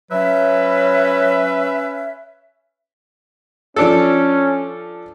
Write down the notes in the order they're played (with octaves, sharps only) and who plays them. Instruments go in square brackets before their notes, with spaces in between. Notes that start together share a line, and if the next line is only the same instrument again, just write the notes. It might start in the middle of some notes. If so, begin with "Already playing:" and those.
[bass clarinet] F#3 [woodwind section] C#4 B4 E5
[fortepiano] F3 D4 A4 [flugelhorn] C#4